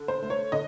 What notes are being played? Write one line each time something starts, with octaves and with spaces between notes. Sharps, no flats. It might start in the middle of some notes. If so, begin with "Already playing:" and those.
Already playing: D3
C5
A3
C#5
D3 D#5